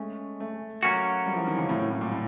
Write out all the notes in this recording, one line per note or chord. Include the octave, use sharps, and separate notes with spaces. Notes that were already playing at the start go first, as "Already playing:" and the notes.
Already playing: G#3 A3 C#4
A3
F#3 A#3 C#4 F#4
G3
F3
E3
D#3
C#3
A2
A2
A2
A#2
A2